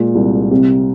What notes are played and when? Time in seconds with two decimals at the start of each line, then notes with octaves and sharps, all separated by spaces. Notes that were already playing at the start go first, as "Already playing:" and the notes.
Already playing: A#2 G#3
0.15 C2
0.51 C3